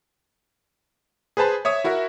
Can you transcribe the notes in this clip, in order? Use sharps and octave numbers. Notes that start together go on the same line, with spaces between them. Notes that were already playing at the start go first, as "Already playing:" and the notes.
G#4 B4 C5 A5 B5
C#5 E5 D#6
E4 F#4 A#4 E5 F#5